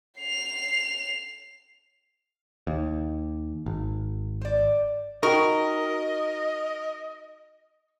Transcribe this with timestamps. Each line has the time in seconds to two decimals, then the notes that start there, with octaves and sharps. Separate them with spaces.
0.18 C7 F7
2.67 D#2
3.66 G#1
4.41 C5 D5
5.23 D#4 F#4 A#4 D#5 G5 C#6